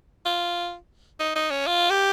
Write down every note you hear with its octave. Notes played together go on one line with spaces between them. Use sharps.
F4
D#4
D#4
C#4
F4
G4